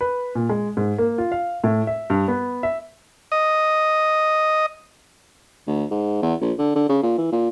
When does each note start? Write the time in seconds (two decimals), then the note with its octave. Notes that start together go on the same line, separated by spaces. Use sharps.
0.01 B4
0.35 A#2
0.49 G#3
0.77 G#2
0.98 A#3
1.18 F4
1.32 F5
1.64 A2
1.87 E5
2.10 G2
2.28 B3
2.63 E5
3.32 D#5
5.67 D2
5.91 G#2
6.22 E2
6.41 A#1
6.58 D3
6.76 D3
6.89 C#3
7.03 A#2
7.18 E3
7.32 A#2